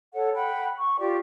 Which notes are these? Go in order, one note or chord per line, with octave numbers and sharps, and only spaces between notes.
A4 C#5 F#5
F#5 G5 B5
C#6
F4 G4 D5